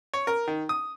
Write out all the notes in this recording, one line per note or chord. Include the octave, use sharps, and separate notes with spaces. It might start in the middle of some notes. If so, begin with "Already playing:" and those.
C#5
A#4
D#3
D#6